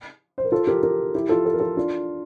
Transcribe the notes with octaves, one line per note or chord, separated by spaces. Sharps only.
C5
A#4
F4 A4
G4 A#4
G4 A#4
E4 G4
F4 A4
A4
A#4
F4 A4
D4 F4